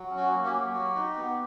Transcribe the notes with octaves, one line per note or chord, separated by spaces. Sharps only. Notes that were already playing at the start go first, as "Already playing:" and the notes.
Already playing: F#3
C#4
F#4
A#3
G4
F#3
F#4
D#4
B3